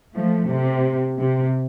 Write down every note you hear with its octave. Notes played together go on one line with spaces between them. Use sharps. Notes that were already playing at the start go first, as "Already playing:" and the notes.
F3 A3
C3
C3